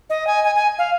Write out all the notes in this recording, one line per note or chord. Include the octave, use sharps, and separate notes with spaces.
D#5
G#5
G#5
G#5
F5